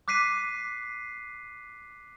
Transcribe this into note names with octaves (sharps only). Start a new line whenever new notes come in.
D6 F#6 B6 C7 D#7